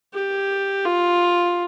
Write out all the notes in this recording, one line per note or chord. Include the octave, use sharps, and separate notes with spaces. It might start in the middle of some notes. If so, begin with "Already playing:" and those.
G4
F4